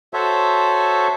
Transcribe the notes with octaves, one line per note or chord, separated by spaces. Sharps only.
F#4 A4 C5 C#5 E5